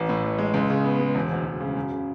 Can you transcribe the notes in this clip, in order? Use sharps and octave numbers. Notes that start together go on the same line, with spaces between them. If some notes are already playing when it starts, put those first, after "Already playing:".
Already playing: A1
A2
A1
G#3
C#2
C#3
B3
G#3
E1
D2
E1
C#3
F#2
C#3